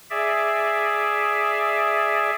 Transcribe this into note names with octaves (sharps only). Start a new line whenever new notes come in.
G#4 D5 E5